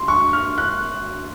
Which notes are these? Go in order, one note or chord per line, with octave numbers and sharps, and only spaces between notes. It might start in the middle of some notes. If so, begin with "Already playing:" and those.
Already playing: D#2 C6
C#6
F6
F#6